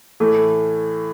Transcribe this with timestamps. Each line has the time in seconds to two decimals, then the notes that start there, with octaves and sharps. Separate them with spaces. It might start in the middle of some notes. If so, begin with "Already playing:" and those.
0.20 A2 E3 A3